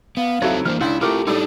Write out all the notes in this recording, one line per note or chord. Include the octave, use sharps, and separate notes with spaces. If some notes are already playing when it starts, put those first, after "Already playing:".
B3 F5
F#3 C4 D#4 E4 A4
E3 A#3 D4 C5 F6
C#2 D4 E4
A3 E4 F4 G4 A#4 D6
A2 G3 D4 D#4 A4